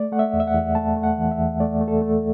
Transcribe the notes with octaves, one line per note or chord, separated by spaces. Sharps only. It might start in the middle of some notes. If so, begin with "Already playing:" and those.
Already playing: A3 D5
A3 F#5
E5
E2
E5
F#5
E2
A3 A5
A3
F#5
E3
E5
E2
A3 D5
A3
A4
A3